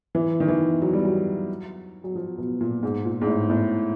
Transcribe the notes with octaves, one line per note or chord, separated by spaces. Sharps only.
E3
D#3
E3
F#3
G3
F#3
F#3
F3
B2
A#2
G#2
A#2
G#2
A2
A2